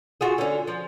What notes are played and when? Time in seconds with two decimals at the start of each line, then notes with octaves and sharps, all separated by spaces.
0.21 F4 F#4 G#4
0.38 D3 C#4
0.67 F3